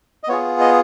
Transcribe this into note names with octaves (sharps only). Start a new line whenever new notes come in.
D#5
B3 F4 G#4 C#5
D#5